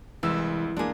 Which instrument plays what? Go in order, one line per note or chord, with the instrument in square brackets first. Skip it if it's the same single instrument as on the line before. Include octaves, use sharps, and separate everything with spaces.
[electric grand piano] C2 G#3 E6 [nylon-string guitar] E3
[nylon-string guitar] G#3 G#4 [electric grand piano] A#3 D4